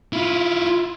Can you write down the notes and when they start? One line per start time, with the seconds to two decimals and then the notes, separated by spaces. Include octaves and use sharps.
0.13 E4 F4